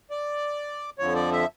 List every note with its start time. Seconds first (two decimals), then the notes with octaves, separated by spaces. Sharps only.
0.11 D5
0.99 F2 D3 F3 C#5
1.15 D5
1.32 E5